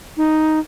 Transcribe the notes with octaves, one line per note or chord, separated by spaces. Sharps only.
D#4